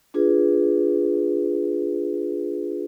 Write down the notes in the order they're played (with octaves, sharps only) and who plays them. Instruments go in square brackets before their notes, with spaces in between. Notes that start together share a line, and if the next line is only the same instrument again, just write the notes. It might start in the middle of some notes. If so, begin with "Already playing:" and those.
[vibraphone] D4 F4 G#4 B4